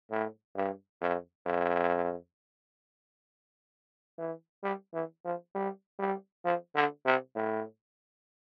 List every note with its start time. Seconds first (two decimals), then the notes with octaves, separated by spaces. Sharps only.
0.11 A2
0.56 G2
1.01 F2
1.46 F2
4.18 E3
4.64 G3
4.94 E3
5.25 F3
5.55 G3
5.99 G3
6.45 F3
6.75 D3
7.06 C3
7.36 A2